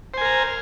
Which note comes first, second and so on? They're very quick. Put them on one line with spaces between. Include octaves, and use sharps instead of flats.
C5 G#5 A#4 A#5